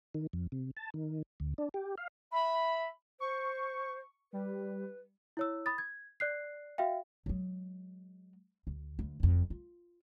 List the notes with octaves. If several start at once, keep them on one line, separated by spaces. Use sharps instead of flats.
D#3
F2
C3
A5
D#3
D2
D4
G4
F5
E5 B5
C5 C#6
G3 B4
E4 C#5 E6
B5 D#6 A6
G#6
D5 F#6 C7
F#4 E5 F5 G5
F#3 G#3
D2
D2
F#1 F2
F4